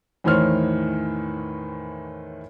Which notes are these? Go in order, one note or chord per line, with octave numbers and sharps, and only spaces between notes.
E2 A2 D#3 C5 C#5 F6